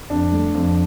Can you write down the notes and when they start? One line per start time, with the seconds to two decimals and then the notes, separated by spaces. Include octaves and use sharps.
0.10 F2 D4
0.32 A3
0.54 F2